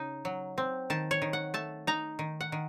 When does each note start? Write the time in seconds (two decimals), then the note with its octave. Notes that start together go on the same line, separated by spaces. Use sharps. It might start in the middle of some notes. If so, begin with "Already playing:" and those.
Already playing: C#3 D#4
0.25 F#3
0.58 C4
0.90 D#3 A5
1.11 C#5
1.22 D#3
1.33 F#5
1.54 A3 A5
1.87 D#4 A#5
2.19 D#3
2.41 F#5
2.52 D#3